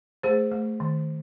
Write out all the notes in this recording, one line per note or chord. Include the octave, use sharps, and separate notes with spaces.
A3 G#4 C5
A3
D#3